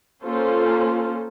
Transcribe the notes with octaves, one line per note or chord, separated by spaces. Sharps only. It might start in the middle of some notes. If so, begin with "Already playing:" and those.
A#3 C#4 F4 A4 C5